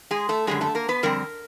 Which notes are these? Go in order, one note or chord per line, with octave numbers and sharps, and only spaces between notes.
G#3 G#4
A3 A4
F#2 D3 G3 G#3 G#4
A3 A4
A#3 A#4
B3 B4
F2 D3 G3 C4 A#4